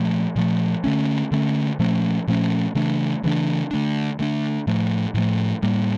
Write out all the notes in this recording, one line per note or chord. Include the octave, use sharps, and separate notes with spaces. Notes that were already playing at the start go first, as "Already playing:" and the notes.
Already playing: A#2 F3 A3
A#2 F3 A3
D3 A3 C#4
D3 A3 C#4
A#2 F3 A3 C#4
A#2 F3 A3 C#4
C#3 E3 A3 D4
C#3 E3 A3 D4
D3 A3 D4
D3 A3 D4
A2 F3 A3
A2 F3 A3
A2 G3 A#3